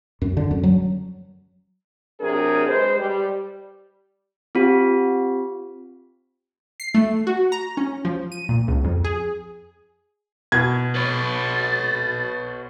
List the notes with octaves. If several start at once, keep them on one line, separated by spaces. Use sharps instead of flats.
F#2
D3
F#2
F#3
C3 F#3 D4 G#4 A#4
G#3 B4 C5
G3
C4 F4 G4
C7
A3
F#4
A#5
C#4
F3
D#7
A#2
C#2
F2
G#4
B2 G#6
B4 C#5 A6